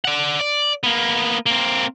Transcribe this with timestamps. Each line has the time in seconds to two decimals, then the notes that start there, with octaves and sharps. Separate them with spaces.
0.05 D5 F#5
0.41 D5
0.83 A#3 B3
1.46 A#3 C4